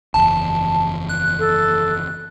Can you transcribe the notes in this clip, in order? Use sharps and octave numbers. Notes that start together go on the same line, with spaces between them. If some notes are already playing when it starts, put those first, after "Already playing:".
F#1 E2 A5
F#6
A4